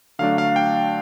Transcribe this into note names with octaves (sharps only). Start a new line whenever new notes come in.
D3 F#3 A3 D4 F5
F5
G5